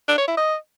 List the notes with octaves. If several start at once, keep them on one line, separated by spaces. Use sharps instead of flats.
D4
C#5
E4
D#5